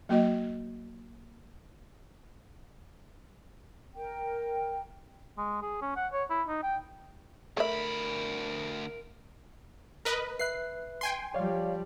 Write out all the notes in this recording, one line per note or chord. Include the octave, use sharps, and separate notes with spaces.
F#3 A#3 F#4 D#5
A#4 G5
G#3
G#4
C#4
F#5
C#5
E4
D#4
G5
D2 A3 A#4 E5 B5
A#4 B4 D#5
B4 E5 F#6 C7
G5 G#5 C6
F3 G3 C#5 D5 F5